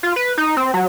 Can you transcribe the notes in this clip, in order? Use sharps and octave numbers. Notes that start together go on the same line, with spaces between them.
F4
B4
D#4
C4
F#3